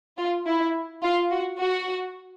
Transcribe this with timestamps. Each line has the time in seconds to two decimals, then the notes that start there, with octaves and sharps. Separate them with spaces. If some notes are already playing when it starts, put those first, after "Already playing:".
0.18 F4
0.46 E4
1.03 F4
1.31 F#4
1.58 F#4